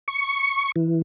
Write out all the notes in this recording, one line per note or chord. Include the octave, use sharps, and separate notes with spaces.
C#6
E3